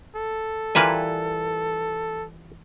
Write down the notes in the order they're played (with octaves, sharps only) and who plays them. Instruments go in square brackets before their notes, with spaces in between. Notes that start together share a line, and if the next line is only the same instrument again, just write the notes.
[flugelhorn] A4
[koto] E3 B4 G#5 [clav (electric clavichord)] G3 F4 A#4